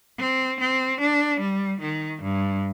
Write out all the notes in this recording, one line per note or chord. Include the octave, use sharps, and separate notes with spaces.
C4
C4
D4
G3
D#3
G2